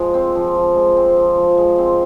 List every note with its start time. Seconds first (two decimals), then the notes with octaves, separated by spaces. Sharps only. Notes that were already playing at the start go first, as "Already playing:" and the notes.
Already playing: F3 G#3
0.14 C4
0.35 F3
0.55 F3
0.75 G#3
0.97 C4
1.17 F3
1.37 F3
1.58 G#3
1.78 C4